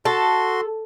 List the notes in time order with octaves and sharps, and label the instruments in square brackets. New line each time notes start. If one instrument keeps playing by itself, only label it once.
[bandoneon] F#4 C6 [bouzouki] A4